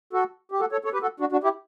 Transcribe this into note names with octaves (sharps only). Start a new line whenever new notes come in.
F#4 A4
G4
F#4 A4
A4 C#5
A4 C#5
G4 B4
F#4 A4
D4 F#4
D4 F#4
E4 G4